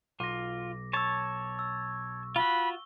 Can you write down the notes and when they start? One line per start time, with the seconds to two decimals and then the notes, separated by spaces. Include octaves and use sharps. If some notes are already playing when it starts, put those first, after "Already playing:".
0.20 B1 F4 D6 A#6
0.93 C#5 A5 C#6 E6
1.59 E6
2.36 F4 F#4 B5 G7